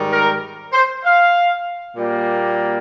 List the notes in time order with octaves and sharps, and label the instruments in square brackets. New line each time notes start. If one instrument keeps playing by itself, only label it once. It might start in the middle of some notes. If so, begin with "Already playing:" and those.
Already playing: [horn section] G#2 D#3 G3
A#4
C5
F5
A#2 G3 A#3